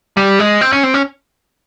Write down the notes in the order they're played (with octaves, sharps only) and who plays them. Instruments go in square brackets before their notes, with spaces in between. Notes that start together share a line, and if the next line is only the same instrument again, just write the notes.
[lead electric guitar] G3
G#3
C4
C#4
C4
C#4